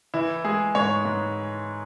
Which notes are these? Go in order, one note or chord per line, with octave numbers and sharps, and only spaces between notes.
E3 E4
G#3 G#4
G#2 C#5
G#2